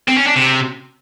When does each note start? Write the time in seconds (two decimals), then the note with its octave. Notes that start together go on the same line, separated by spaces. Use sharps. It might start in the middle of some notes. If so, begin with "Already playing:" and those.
0.08 C4
0.17 C#4
0.27 D4
0.36 C3